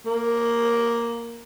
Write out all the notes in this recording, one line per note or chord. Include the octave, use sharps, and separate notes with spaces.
A#3